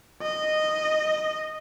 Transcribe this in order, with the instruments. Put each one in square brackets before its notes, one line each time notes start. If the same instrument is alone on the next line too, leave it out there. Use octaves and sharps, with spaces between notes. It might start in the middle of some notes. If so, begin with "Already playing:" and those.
[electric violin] D#5